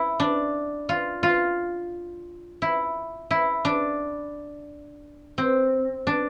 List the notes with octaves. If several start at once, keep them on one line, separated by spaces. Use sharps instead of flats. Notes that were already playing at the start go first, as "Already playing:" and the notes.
Already playing: E4
D4
F4
F4
E4
E4
D4
C4
D4